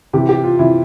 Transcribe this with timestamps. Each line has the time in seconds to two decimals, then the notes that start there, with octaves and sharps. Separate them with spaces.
0.13 C3 E3 G4
0.29 G4
0.44 F4
0.59 C3 E3 E4